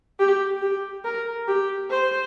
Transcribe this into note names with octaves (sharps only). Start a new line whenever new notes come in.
G4
G4
A#4
G4
C5